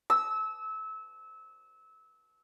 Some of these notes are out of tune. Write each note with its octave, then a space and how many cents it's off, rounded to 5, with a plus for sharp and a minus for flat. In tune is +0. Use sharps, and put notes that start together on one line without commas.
E6 -25